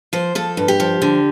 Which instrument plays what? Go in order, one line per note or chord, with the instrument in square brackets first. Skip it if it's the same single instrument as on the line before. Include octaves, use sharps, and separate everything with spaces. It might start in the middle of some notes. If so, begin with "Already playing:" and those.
[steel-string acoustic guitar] F3 C5
F3 A4
G2
G4
F3
D3